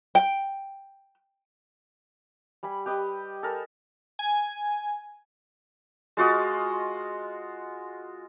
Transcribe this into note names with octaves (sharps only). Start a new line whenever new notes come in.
G5
G3 G#5 B5
G4 B4 D#5
A4 A#4 G#5
G#5
G#3 F4 F#4 D#5